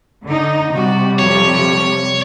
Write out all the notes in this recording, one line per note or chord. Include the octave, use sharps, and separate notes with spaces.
D3 D#4
C3 G3 F#4
F2 F3 G4 C#5